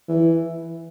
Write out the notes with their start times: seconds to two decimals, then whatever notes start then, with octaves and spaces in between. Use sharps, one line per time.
0.09 E3